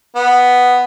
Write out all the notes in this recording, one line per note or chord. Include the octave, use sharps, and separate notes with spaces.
B3